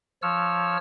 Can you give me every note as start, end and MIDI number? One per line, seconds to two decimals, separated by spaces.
0.22 0.77 53
0.22 0.77 73
0.22 0.77 88
0.22 0.77 89